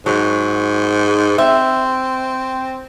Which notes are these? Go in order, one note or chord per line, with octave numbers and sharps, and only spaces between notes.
G#2 F#3
C4 E5